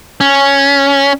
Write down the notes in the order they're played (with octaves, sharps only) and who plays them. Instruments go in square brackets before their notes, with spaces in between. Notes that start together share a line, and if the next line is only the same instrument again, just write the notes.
[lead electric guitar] C#4